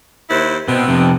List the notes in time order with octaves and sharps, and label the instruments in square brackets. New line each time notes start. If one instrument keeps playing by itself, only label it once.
[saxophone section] D#2 E4 C5
[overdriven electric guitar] B2 [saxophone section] B3 C4
[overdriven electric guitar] F2 C3